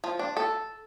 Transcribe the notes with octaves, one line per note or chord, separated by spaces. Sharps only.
F3
D4
A4